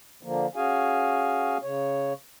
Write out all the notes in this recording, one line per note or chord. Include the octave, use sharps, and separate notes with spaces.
D3 F3 A#3
C#4 F#4 G#4 F5 G#5
C#3 C#5